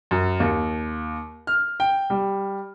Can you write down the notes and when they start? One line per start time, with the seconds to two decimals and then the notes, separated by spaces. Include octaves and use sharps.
0.11 F#2
0.40 D#2
1.47 F6
1.80 G5
2.10 G3